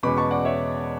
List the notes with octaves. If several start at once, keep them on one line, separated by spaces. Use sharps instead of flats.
E2 B2 G#3 C#4 B5 D6
A5 C#6
D5 F#5
C#5 E5